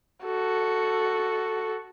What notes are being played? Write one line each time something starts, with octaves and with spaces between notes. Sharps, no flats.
F#4 A4